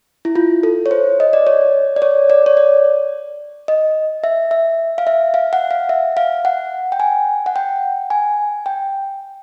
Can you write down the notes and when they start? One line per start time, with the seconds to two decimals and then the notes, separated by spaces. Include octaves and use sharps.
0.25 E4
0.35 F4
0.63 A4
0.86 C#5
0.91 C5
1.20 D#5
1.33 D5
1.47 C#5
1.96 D5
2.02 C#5
2.30 D5
2.46 C#5
2.57 D5
3.68 D#5
4.24 E5
4.51 E5
4.98 F5
5.07 E5
5.34 F5
5.53 F#5
5.71 F5
5.89 E5
6.17 F5
6.45 F#5
6.92 G5
7.00 G#5
7.46 F#5
7.56 G5
8.10 G#5
8.66 G5